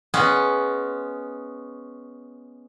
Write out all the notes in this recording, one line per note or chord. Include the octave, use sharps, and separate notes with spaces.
G#3 B3 C#4